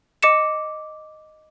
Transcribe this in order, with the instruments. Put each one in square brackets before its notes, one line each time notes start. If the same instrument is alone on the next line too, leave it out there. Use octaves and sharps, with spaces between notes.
[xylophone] D#5 D6 C#7 E7